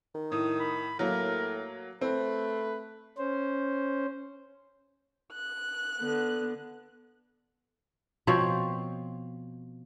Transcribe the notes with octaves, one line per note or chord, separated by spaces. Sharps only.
D#3
A2 D#6
B5
A2 F#3 A#3 A#4
A3 C4 B4
C#4 C5
F#6
D3 B3
B2 F3 C4 C#5